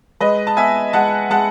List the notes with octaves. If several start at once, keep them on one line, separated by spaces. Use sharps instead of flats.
G#3 B4 D#5
A5
B3 E5 G#5
G#3 F#5 A5
G#3 F#5 A5